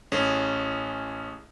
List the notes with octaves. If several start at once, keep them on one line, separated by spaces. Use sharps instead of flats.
A1 C#4 G#4